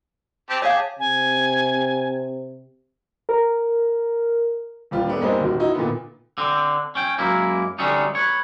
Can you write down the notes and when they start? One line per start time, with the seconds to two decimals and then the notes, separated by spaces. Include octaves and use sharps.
0.50 C4 G4 A5
0.62 G4 G#4 C#5 F5 A5
0.99 C3 G#5
3.29 A#4
4.91 D#1 G3 F4
5.07 A3 B3 D4
5.21 G#2 G3 G#3 A#3 C4 D#4
5.40 D#1 D#3 F#4
5.59 D#4 E4 F#4
5.75 A#2 D3 D#3 B3
6.38 D3 C4
6.95 C#4 G5
7.18 F#2 G#3 A#3 E4
7.78 D3 G3 A3 C#4 D#4
8.15 B4 C#5